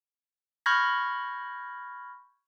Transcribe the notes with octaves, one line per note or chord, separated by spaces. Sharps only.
B5 C#6 F6 G6 G#6 A#6